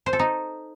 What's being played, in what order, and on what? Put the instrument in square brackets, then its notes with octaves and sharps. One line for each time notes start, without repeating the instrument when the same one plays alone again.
[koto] C5
A4
D#4